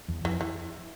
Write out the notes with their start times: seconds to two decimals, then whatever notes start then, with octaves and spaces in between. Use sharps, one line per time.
0.08 E2
0.24 F2 E3
0.41 E3